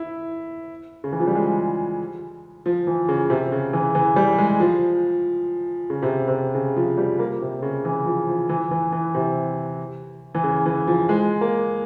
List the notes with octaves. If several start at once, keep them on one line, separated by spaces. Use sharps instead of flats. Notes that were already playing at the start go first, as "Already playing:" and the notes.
Already playing: E4
C#3
E3
F3
G3
G#3
F3
E3
C#3
C3
C#3
E3
E3
G3
G#3
F3
C#3
C3
C3
C#3
F3
G3
A#3
C3
C#3
E3
F3
F3
E3
E3
E3
C3
E3
C#3
E3
F3
G#3
A#3